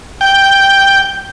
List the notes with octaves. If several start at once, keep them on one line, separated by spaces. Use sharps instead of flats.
G5